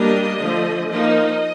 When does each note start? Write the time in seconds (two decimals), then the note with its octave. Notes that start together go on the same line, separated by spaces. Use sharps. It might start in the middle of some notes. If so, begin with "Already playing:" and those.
Already playing: G3 A#3 D4 D#5
0.41 D3 F3 A3
0.89 F3 A#3 D#4 D#5